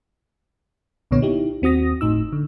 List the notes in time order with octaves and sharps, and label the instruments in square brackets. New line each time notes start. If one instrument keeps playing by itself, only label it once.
[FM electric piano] C2 A#2 D3 B3 C#5
D#4 E4 G4
D#2 C4 F#4 D#6 A#6
G1 A2 D#4 E6
D3